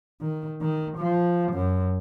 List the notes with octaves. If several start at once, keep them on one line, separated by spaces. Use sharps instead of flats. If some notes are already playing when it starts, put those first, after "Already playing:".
D#3
D#3
F3
F#2